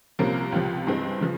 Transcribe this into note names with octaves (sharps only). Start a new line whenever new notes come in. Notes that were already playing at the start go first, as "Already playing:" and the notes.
C2 C3 F3 A#3 C#4
C#2 C3 F3
G2 E3 G#3 C4
C#3 F3